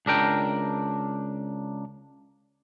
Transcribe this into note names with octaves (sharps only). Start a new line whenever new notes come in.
C#2 D4 A#4 G5